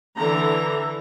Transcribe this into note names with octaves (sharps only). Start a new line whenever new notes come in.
D3 E3 A#5